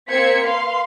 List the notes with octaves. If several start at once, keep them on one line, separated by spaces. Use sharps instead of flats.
A#3 C4 C5 G#6 B6 C#7
B4 F5 C6